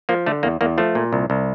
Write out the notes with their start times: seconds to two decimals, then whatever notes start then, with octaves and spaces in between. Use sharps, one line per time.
0.09 F3 A#3
0.26 D3 A3
0.43 E2 A#3
0.61 E2 A#3
0.78 F3 A3
0.95 A#2
1.13 C2
1.30 C2